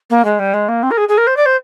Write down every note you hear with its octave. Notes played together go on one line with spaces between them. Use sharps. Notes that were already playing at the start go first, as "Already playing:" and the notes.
A#3
G#3
G3
G#3
A#3
C4
A#4
G#4
G#4
A#4
C5
D5
C5